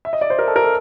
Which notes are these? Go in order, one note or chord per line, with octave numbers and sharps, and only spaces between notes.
E5
D#5
D5
C5
A#4
A4
A#4
A4